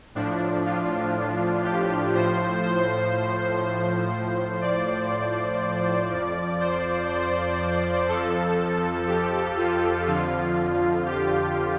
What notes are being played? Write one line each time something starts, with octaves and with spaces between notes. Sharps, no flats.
A2 F3 D4
F4
G4
A2 F3 C5
C5
C5
A2 F3
D5
F2 F3
C5
C5
F2 F3 A4
G4
F4
F2 D3 F3 F4
G4